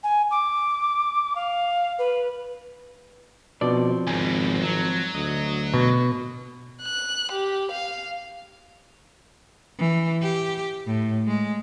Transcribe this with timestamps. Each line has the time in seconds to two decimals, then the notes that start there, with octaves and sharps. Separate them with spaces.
0.03 G#5
0.31 D6
1.35 F5
1.99 B4
3.61 B2 F3 C4 D4 D5
4.07 G#1 C#2 B2 G#5
4.62 F#3
5.15 D2 D#5
5.74 B2
6.83 F#6
7.32 G4
7.72 F5
9.79 E3
10.22 G4
10.86 A2
11.27 G#3